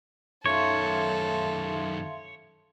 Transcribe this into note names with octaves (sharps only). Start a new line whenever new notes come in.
F#2 D#3 A4 C#5 E5 F5 C6